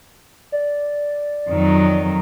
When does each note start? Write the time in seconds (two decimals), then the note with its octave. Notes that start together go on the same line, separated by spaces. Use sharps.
0.52 D5
1.48 F2 D#3 F#3